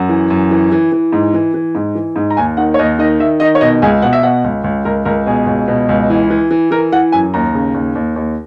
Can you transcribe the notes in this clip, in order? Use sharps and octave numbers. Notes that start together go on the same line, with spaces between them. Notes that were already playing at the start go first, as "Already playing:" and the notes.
Already playing: F#2 F#5
E3
F#2
E3
E3
E3
G#2
E3
E3
G#2
E3
G#2
A#5
D#2 G#5
D#3 F#5
C#5
D#2 D#5
D#3 D#5
D#3 E5
D#3 D#5
C#5
B2 D#5
C#2 G#4
B2 F#5
E5
B2 F#5
C#2
C#2
C#2 A#4
C#2 A#4
B2 G#4
C#2
B2
C#2
E3
E3
E3
E3 A#4
E3 F#5
F#2 G#5
D#2 A#5
C#3
D#2
D#2
D#2